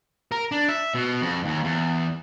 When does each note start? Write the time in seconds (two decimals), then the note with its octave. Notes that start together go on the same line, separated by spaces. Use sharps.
0.32 A#4
0.52 D4
0.68 E5
0.94 B2
1.21 F2
1.44 D#2
1.64 E2